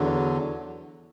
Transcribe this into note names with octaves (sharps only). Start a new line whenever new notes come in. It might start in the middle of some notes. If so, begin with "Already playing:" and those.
Already playing: E2 D3 F#3